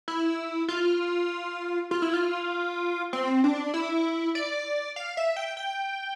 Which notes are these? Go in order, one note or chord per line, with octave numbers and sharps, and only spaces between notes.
E4
F4
F4
E4
F4
C4
D4
E4
D5
F5
E5
G5
G5